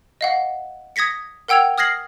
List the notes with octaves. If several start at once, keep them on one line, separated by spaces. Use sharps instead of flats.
D#5 F5 F#5
D#6 G#6 A#6 B6 C#7
A#4 F#5 G5 E6 G#6 F7
D#6 F6 G#6 A#6 C7 F#7